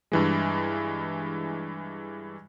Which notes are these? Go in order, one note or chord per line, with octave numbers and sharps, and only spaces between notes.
G2 E3 G#3